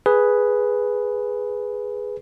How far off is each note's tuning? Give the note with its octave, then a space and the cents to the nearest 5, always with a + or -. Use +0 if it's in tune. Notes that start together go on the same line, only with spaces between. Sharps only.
G#4 +0 B4 +0